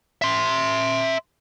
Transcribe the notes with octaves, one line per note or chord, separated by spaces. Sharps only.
E5 C6